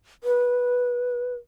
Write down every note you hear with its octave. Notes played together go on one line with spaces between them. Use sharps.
B4